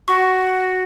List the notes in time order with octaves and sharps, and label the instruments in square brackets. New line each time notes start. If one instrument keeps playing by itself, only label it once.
[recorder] F#4 [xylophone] C#6